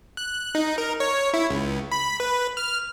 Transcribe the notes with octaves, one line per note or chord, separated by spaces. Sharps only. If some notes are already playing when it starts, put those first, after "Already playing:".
F#6
D#4
A#4
C#5
E4
C#2
B5
B4
F6